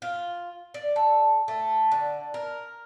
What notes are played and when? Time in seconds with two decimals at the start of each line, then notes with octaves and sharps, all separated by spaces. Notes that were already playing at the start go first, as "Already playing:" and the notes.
0.02 F4
0.74 D5
0.96 A4
1.48 A3
1.91 D3
2.34 A#4